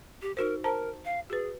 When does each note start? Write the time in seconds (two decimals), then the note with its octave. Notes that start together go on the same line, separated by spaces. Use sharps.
0.22 G4
0.37 D#4 F#4 A#4 C5
0.64 A#4 C5 A5 A#5
1.05 F5
1.30 F#4 G#4 B4